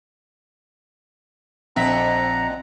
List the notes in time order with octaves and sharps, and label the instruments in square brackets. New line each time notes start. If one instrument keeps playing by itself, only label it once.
[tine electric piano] A#1 B6 [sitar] F2 D3 E5 [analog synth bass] C4 [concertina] F#5 A#5